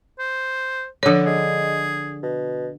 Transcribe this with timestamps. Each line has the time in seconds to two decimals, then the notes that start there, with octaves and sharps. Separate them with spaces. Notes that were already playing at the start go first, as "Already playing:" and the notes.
0.19 C5
1.03 D3 F3 B4 C#5
1.26 G#3 G#4
2.23 B2